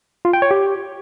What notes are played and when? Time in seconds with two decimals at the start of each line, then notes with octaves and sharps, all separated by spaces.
0.25 F4
0.33 G5
0.42 C#5
0.51 G4